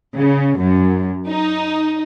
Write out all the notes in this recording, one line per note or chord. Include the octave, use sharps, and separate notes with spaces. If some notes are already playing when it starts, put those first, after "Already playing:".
C#3
F#2
D#4